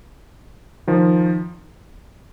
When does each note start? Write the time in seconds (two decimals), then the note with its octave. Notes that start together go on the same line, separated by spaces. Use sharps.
0.88 D#3 F3